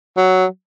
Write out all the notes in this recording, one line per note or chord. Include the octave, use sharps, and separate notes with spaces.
F#3